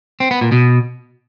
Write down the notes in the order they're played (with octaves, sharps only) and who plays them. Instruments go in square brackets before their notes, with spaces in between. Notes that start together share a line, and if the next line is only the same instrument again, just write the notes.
[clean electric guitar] C4
B3
A#2
B2